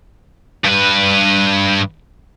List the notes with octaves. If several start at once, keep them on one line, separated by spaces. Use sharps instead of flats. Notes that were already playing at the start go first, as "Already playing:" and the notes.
G2 B4